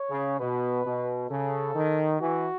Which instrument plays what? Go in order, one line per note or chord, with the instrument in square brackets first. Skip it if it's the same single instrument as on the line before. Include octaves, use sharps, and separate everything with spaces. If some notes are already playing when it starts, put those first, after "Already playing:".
Already playing: [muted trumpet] C#5
[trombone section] C#3
[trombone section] B2 [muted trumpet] B4
[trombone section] B2
[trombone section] C#3 [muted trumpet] A4
[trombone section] D#3
[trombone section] E3 [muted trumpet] F#4